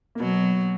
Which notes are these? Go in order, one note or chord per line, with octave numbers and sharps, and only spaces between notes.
A#3
B2 F#3 B3